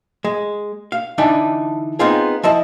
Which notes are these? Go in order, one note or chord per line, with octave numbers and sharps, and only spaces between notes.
G#3
F5
D3 E3 D4 D#4
B3 C4 D#4 F4 G#4
F3 E4 D#5 A5